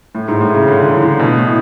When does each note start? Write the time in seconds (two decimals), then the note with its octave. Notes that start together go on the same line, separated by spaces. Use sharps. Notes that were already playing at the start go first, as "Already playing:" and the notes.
0.15 A2
0.28 G#2
0.41 A2
0.54 C#3
0.68 D3
0.80 D3
0.84 E3
1.02 D3
1.19 B2
1.37 A2